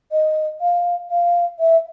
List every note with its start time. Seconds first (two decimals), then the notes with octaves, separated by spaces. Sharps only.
0.12 D#5
0.61 F5
1.10 F5
1.60 E5